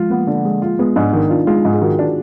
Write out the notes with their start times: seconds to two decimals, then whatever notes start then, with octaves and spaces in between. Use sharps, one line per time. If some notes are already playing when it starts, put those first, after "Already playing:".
Already playing: F3 G#3 F4
0.10 A#3 B3
0.27 D3
0.45 G#3
0.62 F4
0.79 G#3 B3
0.96 G#2 D4
1.13 D#3 D#4
1.30 D4 F4
1.47 G#3 F4
1.65 G#2
1.74 G#4
1.81 D#3 F#4
1.99 D4